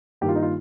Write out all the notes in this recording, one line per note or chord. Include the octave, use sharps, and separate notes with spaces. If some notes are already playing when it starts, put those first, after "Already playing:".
G2 D#3 A#3 G4
F4
D#4
F4